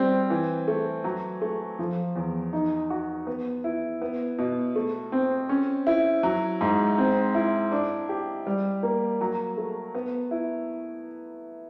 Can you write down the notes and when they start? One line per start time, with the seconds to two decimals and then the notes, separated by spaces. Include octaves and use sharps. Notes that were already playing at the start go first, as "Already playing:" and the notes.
Already playing: G3 C4
0.30 E3
0.68 A3
1.04 F#3
1.42 A3
1.79 F3
2.16 E2
2.53 D#4
2.90 F#4
3.27 B3
3.64 E4
4.02 B3
4.38 B2
4.76 A3
5.12 C4
5.49 C#4
5.87 E4
6.23 F#3
6.61 G#2
6.98 C4
7.35 E4
7.72 D4
8.09 G4
8.47 G3
8.83 A#3
9.21 F#3
9.57 A3
9.95 B3
10.31 E4